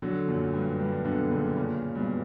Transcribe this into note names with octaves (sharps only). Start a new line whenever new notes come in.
D3 F#3
F#2 A#2
G2
G2
B2 D3
A#2 C#3
A#2 C#3
G2 B2